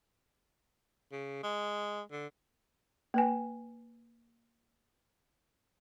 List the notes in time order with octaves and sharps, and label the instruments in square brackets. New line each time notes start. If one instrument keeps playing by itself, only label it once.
[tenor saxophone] C#3
G#3
D3
[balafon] A#3 B4 G#5